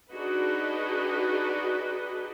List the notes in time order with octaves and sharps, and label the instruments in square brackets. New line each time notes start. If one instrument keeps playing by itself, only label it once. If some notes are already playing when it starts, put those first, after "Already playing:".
[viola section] D4 D#4 F#4 G#4 B4 D#5